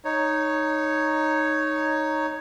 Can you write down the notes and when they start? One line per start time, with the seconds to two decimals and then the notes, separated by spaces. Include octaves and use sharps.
0.05 D#4 C#5